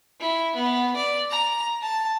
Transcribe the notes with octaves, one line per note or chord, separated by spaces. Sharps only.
E4
B3
D5
A#5
A5